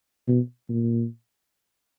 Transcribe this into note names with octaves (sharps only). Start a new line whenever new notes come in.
B2
A#2